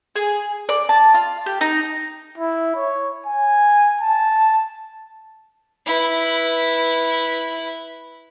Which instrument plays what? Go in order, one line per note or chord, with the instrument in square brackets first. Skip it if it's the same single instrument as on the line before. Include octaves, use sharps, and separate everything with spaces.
[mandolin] G#4
D5
A5
F4
G4
D#4
[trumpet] E4
C#5
G#5
A5
[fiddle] E4 B4